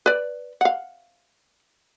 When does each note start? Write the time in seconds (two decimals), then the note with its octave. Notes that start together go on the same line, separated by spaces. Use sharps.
0.06 B4 D5
0.61 F5 F#5